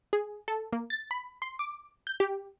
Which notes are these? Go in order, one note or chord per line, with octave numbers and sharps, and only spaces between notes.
G#4
A4
A#3
A6
B5
C6
D6
G6
G4